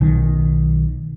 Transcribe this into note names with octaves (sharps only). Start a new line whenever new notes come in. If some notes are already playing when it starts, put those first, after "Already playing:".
B1 D#3